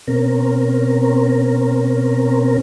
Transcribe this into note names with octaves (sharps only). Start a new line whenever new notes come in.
B2 C4 C#4 A#4